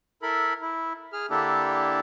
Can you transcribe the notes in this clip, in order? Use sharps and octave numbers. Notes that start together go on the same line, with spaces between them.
E4 A4 A#4 B5
E4
G#4 F6
D3 A#3 D4 E4 G4 A4